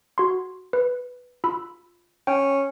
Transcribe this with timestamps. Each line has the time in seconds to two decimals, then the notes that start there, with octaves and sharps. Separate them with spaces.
0.18 F#4 C6
0.73 B4
1.44 F4 B5 E6
2.27 C#4 G5